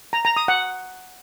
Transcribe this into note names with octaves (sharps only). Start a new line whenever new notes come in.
A#5
A#5
D#6
F#5